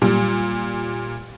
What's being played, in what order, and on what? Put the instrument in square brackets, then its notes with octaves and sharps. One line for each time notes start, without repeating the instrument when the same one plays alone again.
[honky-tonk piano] A#2 G3